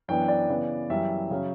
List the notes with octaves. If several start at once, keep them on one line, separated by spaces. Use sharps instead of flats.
F#2 E3 B3 D4 G5
D5
C#3 E3 B3
F#2 E3 G3 E5
C#3 F#3 C#4